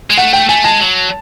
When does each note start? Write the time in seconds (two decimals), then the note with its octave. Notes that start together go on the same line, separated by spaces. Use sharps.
0.10 G#3
0.17 A3 F#5
0.33 G5
0.49 A3 G#5
0.64 G#3 A5
0.80 F#3